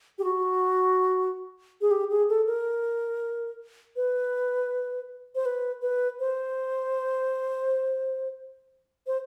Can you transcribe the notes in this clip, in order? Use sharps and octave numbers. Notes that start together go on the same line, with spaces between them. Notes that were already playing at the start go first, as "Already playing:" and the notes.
G4
F#4
G#4
G4
G#4
A4
A#4
B4
C5
B4
B4
C5
C5